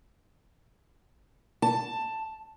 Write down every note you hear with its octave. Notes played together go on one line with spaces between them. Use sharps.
A5